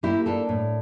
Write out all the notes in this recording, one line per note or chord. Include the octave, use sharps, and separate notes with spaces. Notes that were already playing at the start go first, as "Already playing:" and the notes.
A#3 E4 G4
D4 F4 A4
A2